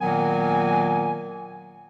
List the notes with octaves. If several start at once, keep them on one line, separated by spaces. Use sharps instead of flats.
A#2 D#3 F#3 A#3 B3 G#5